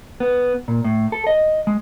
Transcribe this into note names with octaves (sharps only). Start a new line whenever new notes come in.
B3
A#2
A2
A4
D#5
G#3